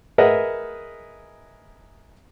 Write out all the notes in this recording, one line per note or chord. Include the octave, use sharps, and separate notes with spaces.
G#4 A#4 B4 D#5 E5 F#5